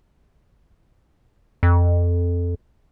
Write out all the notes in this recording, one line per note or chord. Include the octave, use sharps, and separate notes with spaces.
F2